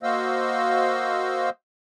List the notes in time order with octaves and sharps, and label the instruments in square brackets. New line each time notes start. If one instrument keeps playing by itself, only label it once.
[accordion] A#3 F#4 C5 D#5 F5 E6